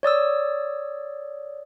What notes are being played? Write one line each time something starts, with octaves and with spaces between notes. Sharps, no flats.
C#5 D5 D#6 E6